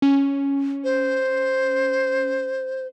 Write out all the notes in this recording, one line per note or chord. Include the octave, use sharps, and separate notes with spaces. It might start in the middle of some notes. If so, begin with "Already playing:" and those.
C#4
C5